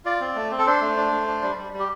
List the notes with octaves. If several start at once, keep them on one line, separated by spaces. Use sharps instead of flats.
F4 D5
C4
A3
C4
A4
D4 C5
A3
D4
A3
D4
G3
G3
G3
G4